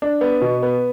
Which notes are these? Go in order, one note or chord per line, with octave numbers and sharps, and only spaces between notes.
D4
B3
B2
B3